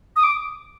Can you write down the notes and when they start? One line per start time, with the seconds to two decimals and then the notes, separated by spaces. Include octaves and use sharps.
0.16 D#6
0.23 D6